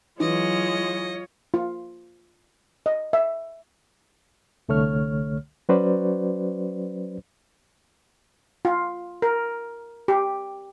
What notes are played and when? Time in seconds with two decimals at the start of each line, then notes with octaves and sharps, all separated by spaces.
0.20 E3 F#3 G#3 F4 C#5 D#5
1.54 F4
2.86 D#5
3.13 E5
4.69 C2 D3 A3 C#5 F6
5.69 F#3 C#4 F#4 B4 C5 D5
8.65 F4
9.22 A#4
10.08 G4